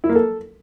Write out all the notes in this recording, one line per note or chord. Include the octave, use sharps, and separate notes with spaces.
E4
A#3
A4